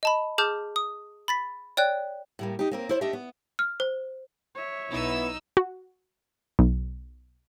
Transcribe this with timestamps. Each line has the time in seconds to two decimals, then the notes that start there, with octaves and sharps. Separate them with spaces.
0.03 D#5 A5 B5
0.38 G#4 A5 D6 F6 G6
0.76 D#6
1.28 B5 A6 B6
1.77 C#5 D5 G5 F#6
2.39 A2 G3 A#3
2.59 D#4 G4
2.71 A#3 C4 A#4
2.89 E4 C5 D5
3.01 A3 D4 G4 D#5 E5
3.13 B3
3.59 F6
3.80 C5
4.55 C#5 E5
4.90 B1 B3 D#4 E4 E6
5.57 F#4
6.59 B1